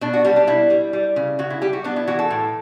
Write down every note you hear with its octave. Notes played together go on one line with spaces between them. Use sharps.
B2 D4
F#4
G3 D4
D4
B2 E4
G3
G3
C#3
C#3 F#4
E4
G3 G4
F#4
B3 D4
E4
E3 F#4
A4
A2